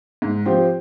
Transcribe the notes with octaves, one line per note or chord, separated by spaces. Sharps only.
G#2
F3 C4 G4